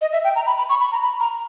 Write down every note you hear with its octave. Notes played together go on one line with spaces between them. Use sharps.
D#5
E5
G5
A#5
B5
B5
C#6
B5
A#5
B5
A#5